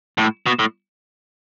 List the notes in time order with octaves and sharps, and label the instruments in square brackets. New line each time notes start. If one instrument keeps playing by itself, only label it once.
[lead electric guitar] A2
B2
A2